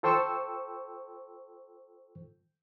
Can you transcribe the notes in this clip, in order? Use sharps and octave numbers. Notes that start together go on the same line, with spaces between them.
F4 A4 C5 G5 C#6 E6